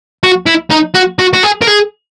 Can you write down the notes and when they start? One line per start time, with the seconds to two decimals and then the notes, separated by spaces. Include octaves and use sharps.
0.23 F#4
0.46 E4
0.71 D#4
0.95 F#4
1.19 F#4
1.33 F#4
1.43 G#4
1.62 A#4
1.67 G#4